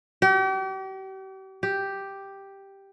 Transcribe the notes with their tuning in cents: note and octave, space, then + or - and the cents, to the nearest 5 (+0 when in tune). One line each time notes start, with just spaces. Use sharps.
G4 -40
G4 +0